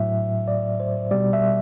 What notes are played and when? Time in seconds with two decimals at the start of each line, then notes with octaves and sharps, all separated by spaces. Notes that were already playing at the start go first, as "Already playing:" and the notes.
Already playing: A2 F#3 E5
0.48 D5
0.80 C5
1.11 B2 G3 D5
1.33 E5